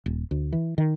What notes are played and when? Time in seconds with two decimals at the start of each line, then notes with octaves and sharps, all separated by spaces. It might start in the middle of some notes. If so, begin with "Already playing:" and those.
0.06 D#1
0.31 D2
0.53 E3
0.78 D#3